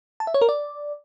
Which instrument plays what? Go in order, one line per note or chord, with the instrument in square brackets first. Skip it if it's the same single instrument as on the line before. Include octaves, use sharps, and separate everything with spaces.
[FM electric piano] A5
E5
C#5
A#4
D5